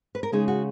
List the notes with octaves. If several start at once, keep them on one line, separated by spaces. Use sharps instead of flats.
B4
A#4
C#3 G#3 D#4 G#4
F#4